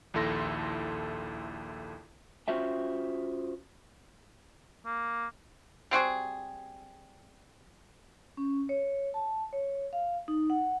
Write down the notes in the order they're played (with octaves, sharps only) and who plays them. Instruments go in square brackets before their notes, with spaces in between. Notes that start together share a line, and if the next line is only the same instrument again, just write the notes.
[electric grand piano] A#1 D#2 E4 A4 C6 A#6
[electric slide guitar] C#4 F4 F#4 C5 E5 G5
[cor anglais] A#3
[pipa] G3 C4 F#4 G#4
[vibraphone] C#4
C#5
A5
C#5
F5
D#4
F#5